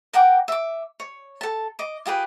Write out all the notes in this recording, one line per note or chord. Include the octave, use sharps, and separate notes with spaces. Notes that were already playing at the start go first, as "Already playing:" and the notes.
A#4 F#5 G5 D6
E5 D6
C#5
A4 A5
D#5 D6
F4 G4 G#4 B4